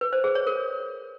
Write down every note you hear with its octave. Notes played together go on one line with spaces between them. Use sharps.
B4
C5
G#4
C#5
A#4